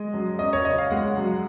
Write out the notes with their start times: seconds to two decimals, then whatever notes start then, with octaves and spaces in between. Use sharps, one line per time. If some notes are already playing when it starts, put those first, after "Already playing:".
Already playing: G#3 D#5
0.14 F#2
0.39 C#4 D#5
0.53 C#5
0.65 C#3 D#5
0.78 F5
0.90 G#3 F#5
1.17 F#2